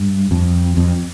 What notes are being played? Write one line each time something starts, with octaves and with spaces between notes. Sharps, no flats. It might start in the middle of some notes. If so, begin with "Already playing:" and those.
Already playing: G2
F2
F2